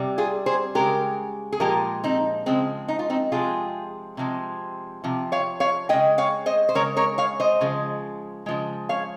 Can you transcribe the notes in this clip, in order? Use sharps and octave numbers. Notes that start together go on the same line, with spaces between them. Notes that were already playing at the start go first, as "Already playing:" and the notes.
Already playing: C3 G3
F4 G#4
G#4 C5
C#3 G#3 G4 A#4
G#4
A#2 F3 G#3 G4 A#4
C4 D#4
C#3 F3 G#3 C4
D#4
F4
C4 D#4
C3 F3 G#3 F4 G#4
C3 F3 G#3
C3 F3
C#5 F5
C#5 F5
C#3 G#3 D#5 G5
C#5 F5
C5 D#5
C5
C#3 G#3 A#4 C#5
A#4 C#5
C#5 F5
C5 D#5
C#3 F3 G#3
C#3 F3 G#3
C#5 F5